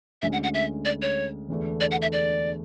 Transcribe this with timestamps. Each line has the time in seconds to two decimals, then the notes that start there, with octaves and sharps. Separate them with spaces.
0.22 D2 D3 G#3 C#4 E5
0.33 F#5
0.43 F#5
0.54 E5
0.85 D5
1.02 C#5
1.49 E1 E2 D3 A3 D4
1.81 D5
1.91 F#5
2.02 E5
2.12 D5